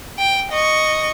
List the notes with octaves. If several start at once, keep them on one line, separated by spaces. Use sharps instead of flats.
G5
D#5 C#6